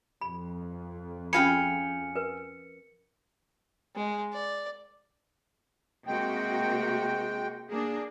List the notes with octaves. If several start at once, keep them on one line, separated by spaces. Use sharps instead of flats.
F2 B5
C#4 F4 G#4 F5 G5 B5 C#7
A#4 B4
G#3
D5
C3 G#3 A#3 F#4 G5
A#3 D4 G#4